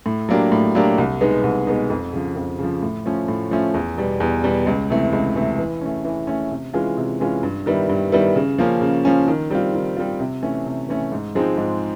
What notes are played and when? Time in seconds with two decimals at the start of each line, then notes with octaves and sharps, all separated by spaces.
0.06 A2
0.29 F#3 A#3 D4 G4
0.52 A2
0.75 F#3 A#3 D4 G4
0.98 C2
1.21 B2 G#3 B3 D#4
1.44 C2
1.67 B2 G#3 B3 D#4
1.90 F2
2.13 C#3 F3
2.36 F2
2.59 C#3 F3
2.83 A2
3.06 F3 A3 C#4
3.28 A2
3.51 F3 A3 C#4
3.74 E2
3.98 B2 G3
4.20 E2
4.44 B2 G3
4.67 C#2
4.90 C3 E3 A3
5.13 C#2
5.36 C3 E3 A3
5.58 E3
5.81 A3 C#4
6.04 E3
6.27 A3 C#4
6.51 C3
6.73 E3 G#3 C#4 F4
6.97 C3
7.20 E3 G#3 C#4 F4
7.43 G2
7.66 D#3 G3 B3 E4
7.89 G2
8.12 D#3 G3 B3 E4
8.35 C#3
8.58 F3 A#3 C#4
8.81 C#3
9.05 F3 A#3 C#4
9.28 D#3
9.51 G3 C4 F4
9.73 D#3
9.97 G3 C4 F4
10.20 C3
10.42 E3 A3 C#4
10.66 C3
10.89 E3 A3 C#4
11.12 G#2
11.35 F3 G#3 C4 D#4
11.57 G#2